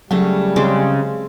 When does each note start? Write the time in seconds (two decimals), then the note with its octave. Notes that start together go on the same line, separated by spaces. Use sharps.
0.11 C#3 F#3 G3 A3
0.56 C#3 G#3 C4 D6